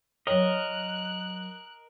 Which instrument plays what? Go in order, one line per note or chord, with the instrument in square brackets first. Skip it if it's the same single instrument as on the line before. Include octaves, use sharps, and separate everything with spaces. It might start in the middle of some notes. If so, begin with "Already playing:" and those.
[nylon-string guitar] F#3 G5 [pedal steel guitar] A#4 D#5 [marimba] C#5 [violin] F#6